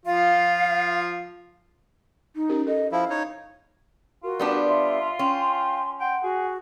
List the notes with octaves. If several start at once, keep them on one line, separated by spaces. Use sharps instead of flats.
F3 F4 F5
D#4
C#4 G4 A#4
A4 D#5
F3 E4 F5
D#4 C#5
F4 F#4 A#4
G3 B3 D4
E5 C6
C#4 G5
F#5 G5 C6
F#4 G#4